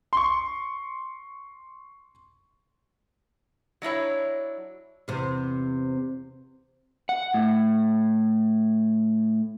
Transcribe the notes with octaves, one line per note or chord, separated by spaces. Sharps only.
C6 C#6
F#3 D4 E4 C#5
E2 C3
F#5
A2